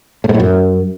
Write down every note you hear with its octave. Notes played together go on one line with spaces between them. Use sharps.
A2
G#2
A2
F#2